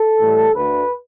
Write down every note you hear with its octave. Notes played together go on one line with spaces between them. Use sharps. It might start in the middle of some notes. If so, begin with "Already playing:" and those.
Already playing: A4
A2 E3 G3
D2 D3 A3 B4